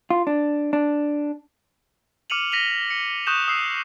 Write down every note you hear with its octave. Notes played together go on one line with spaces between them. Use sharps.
F4
D4
D4
D6 F6 C#7 D#7 F7 F#7
A#6 B6 D#7 F7 G7
C#7
C#6 D#6 F#6 G6 E7
D#6 E6 C7